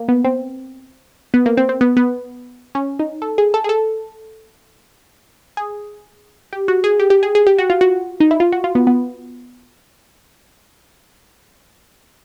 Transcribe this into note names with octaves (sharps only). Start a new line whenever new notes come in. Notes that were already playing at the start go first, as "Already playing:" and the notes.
Already playing: A#3
B3
C4
B3
A#3
C4
C4
B3
B3
C#4
D#4
A4
G#4
A4
G#4
A4
G#4
G4
F#4
G#4
G4
G4
G#4
G#4
G4
F#4
F4
F#4
D#4
E4
F4
F#4
F4
B3
B3